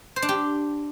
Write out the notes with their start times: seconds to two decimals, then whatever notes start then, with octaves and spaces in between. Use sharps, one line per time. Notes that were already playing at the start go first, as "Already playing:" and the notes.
0.16 C5
0.22 D4
0.29 G4